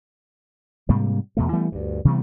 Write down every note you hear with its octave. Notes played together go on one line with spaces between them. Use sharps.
G#2 C3 G3 A#3
E2 B2 A3
E3 G3 A3 B3
D2 G2
C3 E3 G3 B3